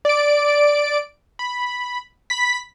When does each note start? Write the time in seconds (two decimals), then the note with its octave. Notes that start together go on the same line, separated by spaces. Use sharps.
0.05 D5 D7
1.39 B5
2.30 B5 B6